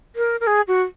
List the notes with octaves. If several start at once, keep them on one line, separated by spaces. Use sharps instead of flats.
A#4
A#4
G#4
F#4